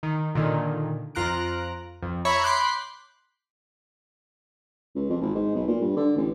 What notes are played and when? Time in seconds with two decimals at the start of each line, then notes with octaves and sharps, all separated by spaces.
0.03 D#3
0.35 A#2 D3 D#3
1.15 F2 F4 A#5 F#6 D7
2.02 F2
2.25 C#5 E5 A#5 B5 C#6 G#6
2.43 B5 C6 D6 F#6 G6
4.96 C#2
5.10 F2
5.21 G#1
5.35 G#2
5.55 B1
5.68 A#2
5.81 G2
5.96 D3
6.16 A1